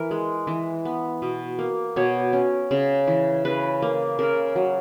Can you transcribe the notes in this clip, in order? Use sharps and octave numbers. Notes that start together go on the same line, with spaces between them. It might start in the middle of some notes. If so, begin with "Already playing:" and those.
Already playing: E3 A#4
G#3
E3
B3
B2
A#3
B2 C#5
C#4
C#3
E3
C#3 B4
A#3
C#3 A#4
F#3